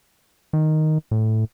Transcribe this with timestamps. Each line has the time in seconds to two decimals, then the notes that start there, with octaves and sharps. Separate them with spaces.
0.53 D#3
1.11 A2